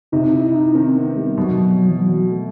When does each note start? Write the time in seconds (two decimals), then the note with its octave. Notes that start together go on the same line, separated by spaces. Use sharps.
0.12 C3 D#4
0.33 E4
0.54 D#4
0.75 D#3 C4
0.96 B3
1.16 G3
1.37 B2 F#3
1.58 F#3
1.78 F#3
1.89 E3
1.99 F#3
2.31 A3